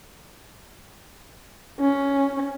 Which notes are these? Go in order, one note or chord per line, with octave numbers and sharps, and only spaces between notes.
C#4